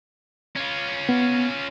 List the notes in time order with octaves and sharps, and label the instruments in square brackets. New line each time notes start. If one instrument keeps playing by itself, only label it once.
[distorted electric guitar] C#4 F4
[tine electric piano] B3